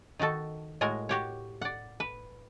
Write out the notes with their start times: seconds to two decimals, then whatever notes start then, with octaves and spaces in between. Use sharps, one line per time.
0.19 D#3 D#4 F#4 A4
0.81 A2 G#3 F#4 A#4
1.09 F#4 G4 C#5
1.61 D5 F#5
2.00 B4